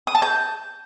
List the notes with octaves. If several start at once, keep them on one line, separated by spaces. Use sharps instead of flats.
D#6
A5
G6